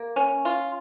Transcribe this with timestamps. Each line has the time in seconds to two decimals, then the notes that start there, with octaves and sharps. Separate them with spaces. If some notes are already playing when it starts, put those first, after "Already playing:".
Already playing: A#3
0.16 C#4
0.45 F4